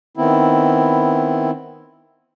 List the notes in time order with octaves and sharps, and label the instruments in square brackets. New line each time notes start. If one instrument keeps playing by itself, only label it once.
[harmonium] D#3 B3 C4 E4